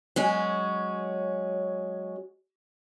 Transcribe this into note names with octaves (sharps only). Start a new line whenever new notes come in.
F#3 G#3 C#4